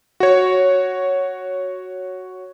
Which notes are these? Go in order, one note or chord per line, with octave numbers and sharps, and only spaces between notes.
F#4 C#5